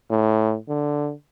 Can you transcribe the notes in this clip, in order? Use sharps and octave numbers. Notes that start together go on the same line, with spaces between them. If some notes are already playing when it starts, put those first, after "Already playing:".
A2
D3